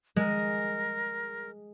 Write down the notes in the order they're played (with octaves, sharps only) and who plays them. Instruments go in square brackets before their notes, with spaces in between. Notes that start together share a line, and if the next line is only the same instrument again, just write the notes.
[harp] G#3 [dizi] A#4